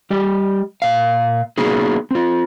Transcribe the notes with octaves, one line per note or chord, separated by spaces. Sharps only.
G3 G4 D#5
A#2 F5
A#3 B3 D#4 F#4 G#4
C4 F4